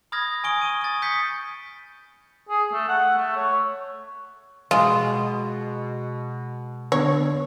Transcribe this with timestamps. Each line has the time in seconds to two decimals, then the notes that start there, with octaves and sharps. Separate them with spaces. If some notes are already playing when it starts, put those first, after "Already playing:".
0.12 B5 D#6 F6 G#6 A#6
0.44 G#5 C#6 D#6 D7 G7
0.62 C#6 D#7
0.81 D#6 A6
1.02 D#6 G6 B6 C#7
2.49 G#4
2.73 A3
2.88 F#5
3.16 A3
3.36 C#5
4.71 B2 G#3 F4
6.92 D3 B3 D4 C#5